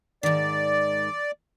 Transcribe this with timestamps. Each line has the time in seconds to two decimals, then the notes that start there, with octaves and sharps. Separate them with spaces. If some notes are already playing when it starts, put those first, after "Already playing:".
0.23 G#2 D#3 D5